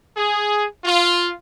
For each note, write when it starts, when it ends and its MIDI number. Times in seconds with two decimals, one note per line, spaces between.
0.17 0.65 68
0.85 1.30 65